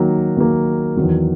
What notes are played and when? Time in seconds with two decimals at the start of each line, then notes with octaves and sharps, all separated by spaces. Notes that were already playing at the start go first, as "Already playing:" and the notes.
Already playing: D#3 F#3 A#3
0.37 D#3 F#3 A#3
0.97 E2 D#3 F#3